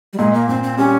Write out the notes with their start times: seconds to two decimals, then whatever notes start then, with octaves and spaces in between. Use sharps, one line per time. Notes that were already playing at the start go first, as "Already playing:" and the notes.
0.13 G3
0.18 A#2 G#3
0.34 A#3
0.49 A#2 C4
0.63 C4
0.78 G3 C#4